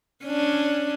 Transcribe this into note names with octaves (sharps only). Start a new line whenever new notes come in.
C#4 D4